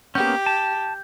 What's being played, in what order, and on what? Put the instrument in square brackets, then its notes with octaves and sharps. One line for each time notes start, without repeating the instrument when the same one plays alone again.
[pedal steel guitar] A#3 B3 C#4 [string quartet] G4 [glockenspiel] G6
[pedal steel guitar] A5